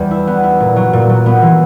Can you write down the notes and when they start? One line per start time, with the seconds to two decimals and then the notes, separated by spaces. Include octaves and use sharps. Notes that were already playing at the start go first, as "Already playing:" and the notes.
Already playing: E2 G3
0.11 E4
0.27 B3
0.43 E4
0.60 A#2
0.76 F#3
0.93 A#2
1.09 F#3
1.26 B3
1.42 E3